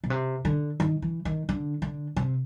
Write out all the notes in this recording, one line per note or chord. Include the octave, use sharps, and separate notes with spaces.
B2
C3
D3
D#3
E3
D#3
D3
D3
C3